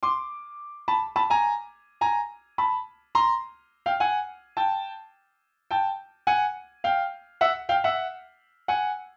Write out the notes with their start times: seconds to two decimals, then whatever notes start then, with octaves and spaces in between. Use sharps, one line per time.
0.03 C6 D6
0.88 A5 B5
1.16 A5 B5
1.30 G#5 A#5
2.01 G#5 A#5
2.58 A5 B5
3.15 A#5 C6
3.86 F5 G5
4.00 F#5 G#5
4.57 G5 A5
5.71 G5 A5
6.27 F#5 G#5
6.84 F5 G5
7.41 E5 F#5
7.69 F5 G5
7.84 E5 F#5
8.68 F#5 G#5